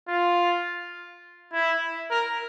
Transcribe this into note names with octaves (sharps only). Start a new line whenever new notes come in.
F4
E4
A#4